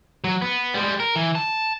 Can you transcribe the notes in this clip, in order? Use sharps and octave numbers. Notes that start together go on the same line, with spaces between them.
F#3
B3
G3 G#3
A#4
E3
A5